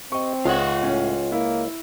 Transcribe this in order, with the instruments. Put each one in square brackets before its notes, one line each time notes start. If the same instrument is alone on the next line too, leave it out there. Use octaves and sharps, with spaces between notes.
[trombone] C4 [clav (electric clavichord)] G4 D#5 [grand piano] C#6
[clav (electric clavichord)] C#2 G#3 D#5 [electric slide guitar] F4 F#5
[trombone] A2 [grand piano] C#4
[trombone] A#3 [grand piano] E4